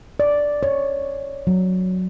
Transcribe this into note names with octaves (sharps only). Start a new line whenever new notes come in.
D5
C#5
F#3